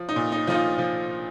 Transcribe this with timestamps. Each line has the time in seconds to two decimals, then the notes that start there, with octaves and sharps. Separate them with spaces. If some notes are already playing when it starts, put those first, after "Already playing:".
Already playing: F3
0.09 D#4
0.16 A#2
0.32 D#4
0.47 F3 D#4
0.54 F4
0.78 F3